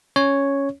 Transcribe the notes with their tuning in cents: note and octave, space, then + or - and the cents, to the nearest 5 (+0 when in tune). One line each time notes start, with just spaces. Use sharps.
C#4 +0 C#5 +0